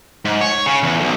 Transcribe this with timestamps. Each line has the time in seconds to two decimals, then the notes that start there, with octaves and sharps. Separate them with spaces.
0.25 G#2
0.41 C#5
0.66 C#3
0.83 E2
1.01 B1